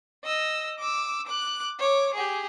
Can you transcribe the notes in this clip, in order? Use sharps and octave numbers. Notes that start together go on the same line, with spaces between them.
D#5 E6
D6 E6
D6 F#6
C#5 D6
G4 G#4